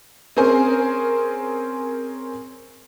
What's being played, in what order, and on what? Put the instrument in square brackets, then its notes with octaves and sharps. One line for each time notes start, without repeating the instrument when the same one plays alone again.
[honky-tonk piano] C4 C#4 G#4 A#4 C5 G#5